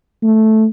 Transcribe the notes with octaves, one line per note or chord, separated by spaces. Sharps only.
A3